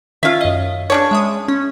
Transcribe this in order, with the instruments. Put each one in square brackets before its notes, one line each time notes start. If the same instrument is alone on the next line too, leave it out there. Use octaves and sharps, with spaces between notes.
[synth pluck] D#3 C#4 F4 [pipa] E5 F5
[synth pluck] F#2 D#5
[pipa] C#3 D4 C#5
[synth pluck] G#3 E5 D#6
C#4